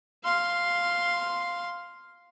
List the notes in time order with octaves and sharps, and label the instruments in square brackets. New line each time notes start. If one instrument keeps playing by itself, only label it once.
[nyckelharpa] F5 C6